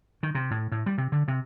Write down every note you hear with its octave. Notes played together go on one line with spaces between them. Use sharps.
D#3
C3
A2
A2
G3
C3
D3
C3